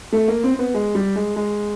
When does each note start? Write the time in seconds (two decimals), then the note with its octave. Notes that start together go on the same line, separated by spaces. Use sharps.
0.12 A3
0.28 A#3
0.44 C4
0.54 C4
0.59 B3
0.74 G#3
0.95 G3
1.16 G#3
1.36 G#3